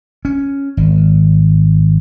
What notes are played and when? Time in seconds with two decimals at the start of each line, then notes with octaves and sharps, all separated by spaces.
0.25 C#4
0.77 G#1